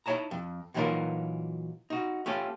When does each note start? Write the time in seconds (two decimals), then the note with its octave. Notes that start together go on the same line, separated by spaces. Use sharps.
0.06 D#4 E4 F#4 C#5 A5 A#5
0.31 F2
0.74 A#2 E3 F#3 D#4 F4 A#4
1.90 D#4 F#4
2.26 A3 C#4 F4 G4 A4